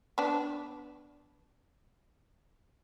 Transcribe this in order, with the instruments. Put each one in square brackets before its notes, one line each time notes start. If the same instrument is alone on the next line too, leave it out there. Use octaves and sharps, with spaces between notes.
[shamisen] B3 D4